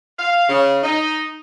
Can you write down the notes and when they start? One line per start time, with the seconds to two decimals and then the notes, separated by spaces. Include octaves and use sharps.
0.18 F5
0.48 C#3
0.84 D#4